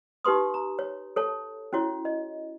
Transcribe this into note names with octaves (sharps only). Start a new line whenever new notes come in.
D#4 G4 B4 C6 D#6
A#5
C#5
A4 C#5 A5
C#4 E4 F#4 C#5
D#5